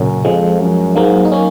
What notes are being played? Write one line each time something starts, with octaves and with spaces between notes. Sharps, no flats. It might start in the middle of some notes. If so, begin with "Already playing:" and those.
Already playing: F#2 A#2 C#3
F2 F3 G#3
F#2
G#2 F#3 A#3
D#4
A#3 C#4